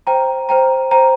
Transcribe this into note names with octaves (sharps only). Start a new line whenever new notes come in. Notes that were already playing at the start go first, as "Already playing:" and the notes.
C5 G5 A#5
C5 G5 A#5
C5 G5 A#5